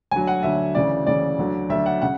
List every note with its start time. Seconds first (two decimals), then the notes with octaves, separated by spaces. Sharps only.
0.11 D2 D3 F#3 G#5
0.27 F#5
0.43 D2 D3 F#3 E5
0.75 D2 C#3 E3 D5
1.06 D2 C#3 E3 D5
1.38 D2 D3 F#3
1.69 D2 D3 F#3 E5
1.86 F#5
2.02 C#3 F#5